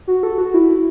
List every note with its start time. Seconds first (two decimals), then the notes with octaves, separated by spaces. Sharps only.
0.08 F#4
0.23 A4
0.38 F#4
0.54 E4